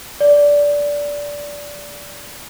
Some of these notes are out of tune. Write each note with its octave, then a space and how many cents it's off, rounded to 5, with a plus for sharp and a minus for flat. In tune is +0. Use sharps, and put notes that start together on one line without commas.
D5 -15